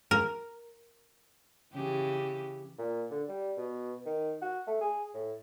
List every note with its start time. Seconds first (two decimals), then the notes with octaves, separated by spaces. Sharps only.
0.11 A#4
1.75 C#3 E3 G4
2.78 A#2
3.10 D3
3.28 G3
3.57 B2
4.06 D#3
4.41 F#4
4.67 A3
4.81 G#4
5.14 A2